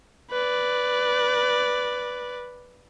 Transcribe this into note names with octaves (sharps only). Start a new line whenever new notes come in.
B4 D5